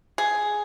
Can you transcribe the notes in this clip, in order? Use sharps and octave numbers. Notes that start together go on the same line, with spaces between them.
G#4